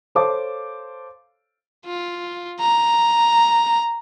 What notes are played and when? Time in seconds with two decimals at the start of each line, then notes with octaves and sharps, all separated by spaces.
0.15 A4 C5 C#5 F5 A5 D6
1.86 F4
2.60 A#5